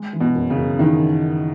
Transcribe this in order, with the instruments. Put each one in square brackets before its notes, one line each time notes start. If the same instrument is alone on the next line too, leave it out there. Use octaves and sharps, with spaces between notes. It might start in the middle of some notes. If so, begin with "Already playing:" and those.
Already playing: [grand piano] G#3
E3
[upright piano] B2
[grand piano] F#2
[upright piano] C#3
[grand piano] F#2
[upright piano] D#3 [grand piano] E3